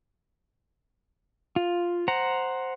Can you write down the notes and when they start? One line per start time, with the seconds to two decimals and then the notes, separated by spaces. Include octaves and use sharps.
1.56 F4
2.08 C5 F#5 A#5